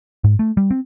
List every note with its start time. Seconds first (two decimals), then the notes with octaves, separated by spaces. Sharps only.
0.24 G#2
0.39 A3
0.57 G3
0.71 C4